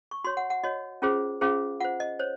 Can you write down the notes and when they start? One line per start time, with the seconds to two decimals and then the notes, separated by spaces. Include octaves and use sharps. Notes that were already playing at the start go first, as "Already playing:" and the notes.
0.11 C#6
0.24 F#4 C#5 C6
0.37 F#5
0.50 F#5
0.64 F#4 C#5 D#5
1.02 C#4 F4 G#4 C5
1.41 C#4 F4 G#4 C5 F5
1.80 F4 C5 F#5
2.00 D#5
2.19 C5 C#5